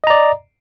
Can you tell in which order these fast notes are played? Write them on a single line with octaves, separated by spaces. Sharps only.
D#5 A#5 D5